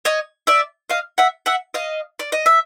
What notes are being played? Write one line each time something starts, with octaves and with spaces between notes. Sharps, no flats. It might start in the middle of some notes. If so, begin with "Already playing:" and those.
C#5 D#5
D5 E5
D#5 F5
E5 F#5
E5 F#5
D#5 F5
D5
D#5
E5